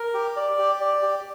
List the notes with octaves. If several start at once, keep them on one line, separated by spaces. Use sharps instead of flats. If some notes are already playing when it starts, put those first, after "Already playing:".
Already playing: A#4
G4
D5
G4
D5
G4